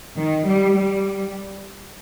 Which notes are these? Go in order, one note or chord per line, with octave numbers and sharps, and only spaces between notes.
D#3
G3
G3